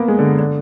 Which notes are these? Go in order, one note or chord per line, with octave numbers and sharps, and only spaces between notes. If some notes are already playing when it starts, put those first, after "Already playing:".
Already playing: A#3 B3
G#3
D3
D3